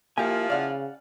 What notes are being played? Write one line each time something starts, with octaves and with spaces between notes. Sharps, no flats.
F3 A#3 E4 F4 G4 G#5
C#3 D5 F5 F#5